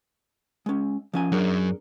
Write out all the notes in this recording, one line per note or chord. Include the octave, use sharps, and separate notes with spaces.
G#3 C#4
F3 C#4 G#5
F#2 D4 G#4 A#4